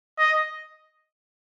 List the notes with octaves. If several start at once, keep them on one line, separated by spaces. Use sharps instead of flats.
D#5